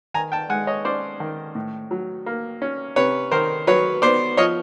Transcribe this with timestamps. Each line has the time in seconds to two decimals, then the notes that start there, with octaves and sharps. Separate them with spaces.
0.14 D#3 G#5 A#5
0.32 G5 A5
0.49 G#3 F#5 G#5
0.67 C#5 D#5
0.85 C#4 C5 D5
1.20 D#3
1.55 A2
1.91 F#3
2.26 A#3
2.62 C#4
2.96 C3 B4 C#5
3.32 D#3 A#4 C5
3.67 F#3 B4 C#5
4.02 B3 C5 D5
4.37 F3 C#5 D#5